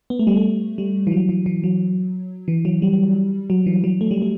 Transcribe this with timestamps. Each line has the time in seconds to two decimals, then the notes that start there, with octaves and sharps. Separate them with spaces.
0.10 B3
0.19 A3
0.27 G3
0.36 A3
0.78 G3
1.07 E3
1.12 F#3
1.29 E3
1.46 E3
1.64 F#3
2.48 E3
2.65 F#3
2.82 G3
3.50 F#3
3.66 E3
3.84 F#3
4.01 A3
4.11 G3
4.22 A3